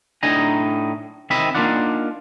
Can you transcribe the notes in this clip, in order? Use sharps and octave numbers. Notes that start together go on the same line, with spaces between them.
A2 D4 D#4 D#5 G#5 A#5
D#3 C4 D#5 E5 B5
A#3 D4 D#4 F4 D5 F#5